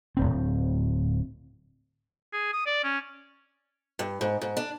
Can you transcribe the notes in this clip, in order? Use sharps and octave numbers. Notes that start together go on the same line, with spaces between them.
D1 G1 C4
G#4
D#6
D5
C#4
G2
G#2
G#2
D4